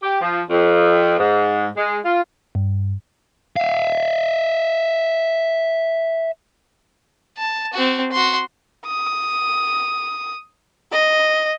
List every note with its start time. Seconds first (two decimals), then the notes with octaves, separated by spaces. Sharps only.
0.03 G4
0.21 F3
0.50 F2
1.18 G#2
1.76 G#3
2.05 F4
2.55 G2
3.56 E5 F5
7.37 A5
7.73 C4 F#4
8.12 F#4 C6
8.86 D#6
10.92 D#5